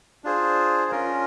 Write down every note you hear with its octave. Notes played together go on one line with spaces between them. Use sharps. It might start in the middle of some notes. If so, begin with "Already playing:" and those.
D4 F4 G#4 C5
C#4 F4 A#4